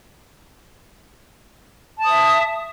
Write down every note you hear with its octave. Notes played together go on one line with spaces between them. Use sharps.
E5 A5 D#6